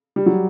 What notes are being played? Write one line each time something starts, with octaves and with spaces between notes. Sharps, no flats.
G3
F#3